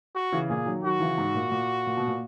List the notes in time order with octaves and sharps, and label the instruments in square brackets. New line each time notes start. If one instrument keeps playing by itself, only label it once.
[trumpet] F#4
[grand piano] C#3 E3
[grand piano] A#2 [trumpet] G#4
[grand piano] D#3 F#3
[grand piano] D#3 F#3 [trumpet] F#4
[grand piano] C#3 E3
G#2
A#2
A#2
A#2
B2
A#2